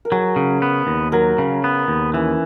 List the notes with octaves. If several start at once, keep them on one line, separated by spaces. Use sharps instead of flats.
A#4
F#3 G#4
C#3
B3
D#2
F#3 A#4
C#3
B3
D#2
E3 C#4